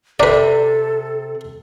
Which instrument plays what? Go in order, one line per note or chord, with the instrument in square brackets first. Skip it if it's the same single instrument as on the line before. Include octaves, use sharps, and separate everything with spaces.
[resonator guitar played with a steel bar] C3 [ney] A4 [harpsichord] B4 D5